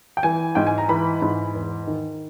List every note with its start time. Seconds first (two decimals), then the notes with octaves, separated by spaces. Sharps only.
0.17 G5
0.23 E3 G#5
0.55 G#2 G5
0.67 G#5
0.78 A#5
0.89 E3 B5
1.22 G#2
1.55 E2
1.87 D#3